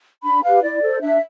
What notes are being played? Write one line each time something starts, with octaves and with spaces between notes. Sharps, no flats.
D4 B5
G4 B4 F5
E4 D5
A4 C5
D4 E5